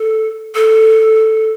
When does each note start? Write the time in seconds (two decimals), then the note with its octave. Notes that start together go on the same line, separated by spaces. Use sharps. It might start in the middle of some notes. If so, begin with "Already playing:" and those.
Already playing: A4
0.55 A4